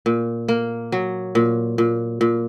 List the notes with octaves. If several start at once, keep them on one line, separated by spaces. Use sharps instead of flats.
A#2
A#3
F#3
A#2
A#2
A#2